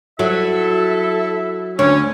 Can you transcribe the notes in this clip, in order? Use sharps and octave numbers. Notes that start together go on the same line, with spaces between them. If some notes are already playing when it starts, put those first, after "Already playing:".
F#3 E4 A4 E5
D2 C#4 C#5